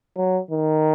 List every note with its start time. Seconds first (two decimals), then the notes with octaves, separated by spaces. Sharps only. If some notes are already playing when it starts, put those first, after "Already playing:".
0.16 F#3
0.50 D#3